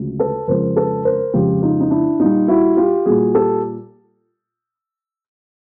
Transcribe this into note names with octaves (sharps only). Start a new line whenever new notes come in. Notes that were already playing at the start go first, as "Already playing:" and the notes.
Already playing: D2 C#3 F3 G#3
A4 B4
F2 C#3 F3 G#3 A#4 C5
A4 B4
A#4 C5
F2 C#3 F3 G#3 F4 G4
D#4 F4
D#4
D4 E4
A#2 G3 D#4 F4
E4 F#4
F4 G4
A#2 G3 F#4 G#4
G4 A4